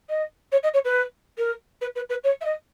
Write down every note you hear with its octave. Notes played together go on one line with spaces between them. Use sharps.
D#5
C#5
D#5
C#5
B4
A#4
B4
B4
B4
C#5
E5
D#5